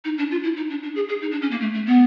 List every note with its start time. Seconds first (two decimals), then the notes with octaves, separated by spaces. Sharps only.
0.05 D#4
0.18 D4
0.31 F4
0.43 E4
0.57 D#4
0.70 D4
0.83 D4
0.95 G#4
1.09 G#4
1.22 D#4
1.31 D4
1.42 C#4
1.51 A#3
1.61 A3
1.74 A3
1.86 B3